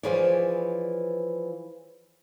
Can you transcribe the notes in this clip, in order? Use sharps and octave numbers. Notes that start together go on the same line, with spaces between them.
E3 F3 G#4 B4 C#5 D5